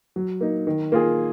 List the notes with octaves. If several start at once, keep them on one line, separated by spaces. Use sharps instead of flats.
F#3
A#3 D#4
D#3
A#3 F4 G#4